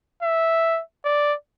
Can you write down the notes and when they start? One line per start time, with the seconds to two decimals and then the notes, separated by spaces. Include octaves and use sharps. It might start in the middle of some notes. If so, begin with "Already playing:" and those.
0.22 E5
1.05 D5